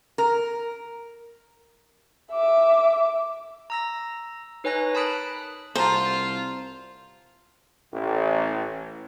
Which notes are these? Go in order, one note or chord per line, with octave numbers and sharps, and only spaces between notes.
A#4
E5 D6
A#5 E6 A#6
D#4 B4 C#5 G#5 F#6 A#6
A#4 A5 B5 D#6 F#6 D7
C2 F4 F#4 C5 A5 A#5
A1